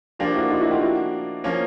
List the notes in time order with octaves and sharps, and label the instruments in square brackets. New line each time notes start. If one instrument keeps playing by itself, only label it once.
[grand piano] F3 A#3 D4 [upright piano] F4 G4
[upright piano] E4 F#4
D#4 F4
E4 F#4
F4 G4
E4 F#4
[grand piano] F3 A#3 C#4